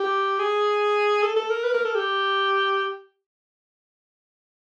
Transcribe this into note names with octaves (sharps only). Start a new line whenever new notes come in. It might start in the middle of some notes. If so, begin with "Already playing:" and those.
Already playing: G4
G#4
A4
A4
A#4
B4
A#4
A4
G4